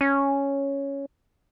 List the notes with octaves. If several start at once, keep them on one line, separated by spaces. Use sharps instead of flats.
C#4